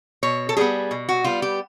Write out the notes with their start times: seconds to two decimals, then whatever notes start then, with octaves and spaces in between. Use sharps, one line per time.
0.23 B2 C#5
0.49 A4
0.57 G3 B3 G#4
0.91 B2
1.09 F#4
1.24 G3 B3 F4
1.42 G4